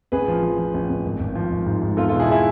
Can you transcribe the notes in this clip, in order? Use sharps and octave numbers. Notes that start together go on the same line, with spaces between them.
A1 G#4 B4
F3
F3
F3
A1
A1
G#1
G#1
F3
G#1
G#2
G#2
E2 F4 A4
F4 A4
B2
E4 G#4
E4 G#4